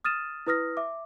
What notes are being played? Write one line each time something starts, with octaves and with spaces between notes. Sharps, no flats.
D#6 F6 A6 D#7 E7
E4 B4 D#6 F6 A#6
E5 D6